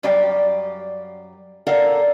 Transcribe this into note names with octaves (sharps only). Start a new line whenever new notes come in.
F#2 G3 G4 D5 F5 G5
A4 A#4 D5 F5 F#5